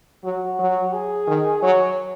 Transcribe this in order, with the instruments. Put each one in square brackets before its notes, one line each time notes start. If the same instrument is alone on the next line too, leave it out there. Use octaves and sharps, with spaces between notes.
[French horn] F#3 [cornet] F#4
[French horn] F#3
[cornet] G#4
[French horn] D#3
[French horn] F#3 [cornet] C#5